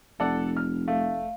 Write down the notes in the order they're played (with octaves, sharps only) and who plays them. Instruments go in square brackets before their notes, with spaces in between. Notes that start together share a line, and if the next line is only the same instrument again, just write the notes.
[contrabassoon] F1 [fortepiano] A4 D5 F#5
[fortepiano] F6
[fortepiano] A3 [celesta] F5